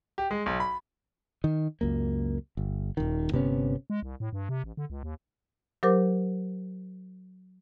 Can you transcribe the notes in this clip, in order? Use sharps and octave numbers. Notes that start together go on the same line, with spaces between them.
G4
G#3
B1
B5
D#3
C#2 F#2 A#3
G1
D#1 D#3
G1 C3 B3 C#4
G#3
C2
A2
G2
C3
A1
D3
C#2
D#2
F#3 G4 A#4 C5 D6